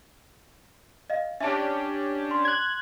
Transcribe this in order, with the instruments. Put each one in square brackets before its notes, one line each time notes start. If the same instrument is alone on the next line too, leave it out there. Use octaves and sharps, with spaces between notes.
[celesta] D#5 F5
[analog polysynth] C#4 D4 G4 [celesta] E5 A5
[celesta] C6
[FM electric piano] F#6 G#6